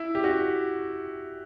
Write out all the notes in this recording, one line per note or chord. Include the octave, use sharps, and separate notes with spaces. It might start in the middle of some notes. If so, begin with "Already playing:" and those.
Already playing: E4
G4
F#4